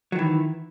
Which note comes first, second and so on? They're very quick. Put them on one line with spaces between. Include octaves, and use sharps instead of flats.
F#3 D#3 E3